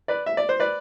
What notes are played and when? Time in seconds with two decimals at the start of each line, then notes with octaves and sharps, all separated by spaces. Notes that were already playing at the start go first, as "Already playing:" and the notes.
0.08 B4 D5
0.26 E5
0.37 D5
0.49 C5
0.60 B4 D5